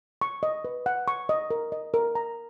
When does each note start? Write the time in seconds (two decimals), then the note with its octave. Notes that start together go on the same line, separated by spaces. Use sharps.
0.21 C#6
0.43 D#5
0.65 B4
0.86 F#5
1.08 C#6
1.29 D#5
1.51 A#4
1.72 D#5
1.94 A#4
2.15 A#5